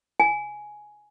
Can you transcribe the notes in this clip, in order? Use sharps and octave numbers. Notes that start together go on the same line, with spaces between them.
G#5